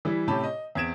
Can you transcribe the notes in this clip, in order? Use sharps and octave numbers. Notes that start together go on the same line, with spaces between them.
E3 G3 E4
A2 C3 C#4 G4 A5 B5
D#5
E2 C4 G#6 D7 E7